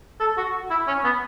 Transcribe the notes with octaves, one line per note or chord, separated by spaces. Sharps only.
A4
F#4
E4
C#4
B3